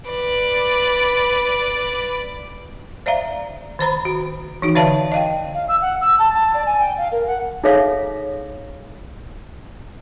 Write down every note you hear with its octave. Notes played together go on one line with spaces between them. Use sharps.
B4 D5
C5 D5 E5 F5 A#5
D#3 C5 A#5 B5
F#4
E3 D#4 F#4
D3 C#5 D5 E5 F5 A5
D#5 F5 G5
F5
E6
F#5
E6
A5
A5
D5
G#5
G5
F5
A#4
F#5
D#4 G#4 A4 C#5 E5 F5